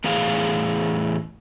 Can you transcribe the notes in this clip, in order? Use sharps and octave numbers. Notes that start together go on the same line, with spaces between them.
E2 A2 G#4 F5